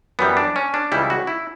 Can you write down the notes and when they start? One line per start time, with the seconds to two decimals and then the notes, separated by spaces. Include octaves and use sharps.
0.19 F#2 E3 G3 B3
0.37 D4
0.56 C#4
0.74 D4
0.92 C#2 C#3 E3 G3 E4
1.10 F#4
1.27 E4